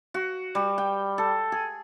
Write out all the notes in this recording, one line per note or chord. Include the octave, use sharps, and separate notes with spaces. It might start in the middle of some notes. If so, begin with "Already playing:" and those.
F#4
G3
G5
A4
G#4